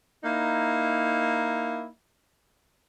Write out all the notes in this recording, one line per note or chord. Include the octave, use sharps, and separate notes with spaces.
A#3 D#4 E4